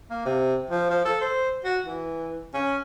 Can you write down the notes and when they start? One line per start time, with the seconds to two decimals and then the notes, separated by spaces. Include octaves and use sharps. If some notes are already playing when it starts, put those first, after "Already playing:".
0.10 A#3
0.25 C3
0.70 F3
0.90 F3
1.05 A4
1.21 C5
1.64 F#4
1.85 E3
2.54 C#4